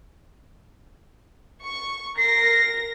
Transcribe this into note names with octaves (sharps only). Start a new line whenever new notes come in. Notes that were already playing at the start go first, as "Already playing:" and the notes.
C#6
A#4 A#6 C7